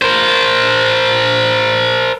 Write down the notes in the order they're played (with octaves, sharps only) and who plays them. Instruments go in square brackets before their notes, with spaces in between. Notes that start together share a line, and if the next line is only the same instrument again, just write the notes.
[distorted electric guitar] A#4 C5